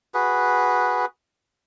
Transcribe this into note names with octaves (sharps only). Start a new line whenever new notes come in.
F#4 G#4 B4